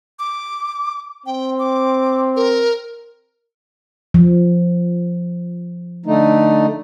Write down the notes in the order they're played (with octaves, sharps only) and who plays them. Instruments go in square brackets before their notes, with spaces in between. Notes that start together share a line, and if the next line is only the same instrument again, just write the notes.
[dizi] D6
[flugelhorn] C4 [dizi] G5
[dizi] D6
A#4
[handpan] F3
[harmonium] D3 A3 D#4